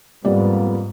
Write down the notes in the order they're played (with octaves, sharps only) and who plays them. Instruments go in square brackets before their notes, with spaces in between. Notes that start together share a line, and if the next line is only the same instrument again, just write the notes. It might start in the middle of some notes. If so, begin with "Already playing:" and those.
[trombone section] F2 A#3 B3 [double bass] G#2 [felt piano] G3 D5